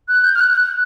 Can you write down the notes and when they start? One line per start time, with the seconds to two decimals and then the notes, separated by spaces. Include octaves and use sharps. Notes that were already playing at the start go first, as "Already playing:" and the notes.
0.08 F#6
0.24 G6
0.35 F6
0.40 F#6
0.51 F#6
0.61 F#6